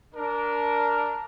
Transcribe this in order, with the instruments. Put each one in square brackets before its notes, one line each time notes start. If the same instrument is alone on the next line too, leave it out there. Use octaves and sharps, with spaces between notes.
[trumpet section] D4 A#4